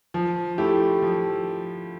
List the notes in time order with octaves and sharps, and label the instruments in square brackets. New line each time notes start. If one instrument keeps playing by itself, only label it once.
[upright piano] F3
A3 E4 G4
F3